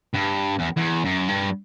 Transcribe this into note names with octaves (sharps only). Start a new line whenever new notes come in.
G2
E2
E2
F#2
G2